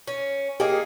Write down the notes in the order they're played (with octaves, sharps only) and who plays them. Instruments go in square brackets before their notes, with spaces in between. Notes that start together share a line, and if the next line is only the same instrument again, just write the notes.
[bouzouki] C#4
[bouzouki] A#3 D#4 G#4 [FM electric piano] G4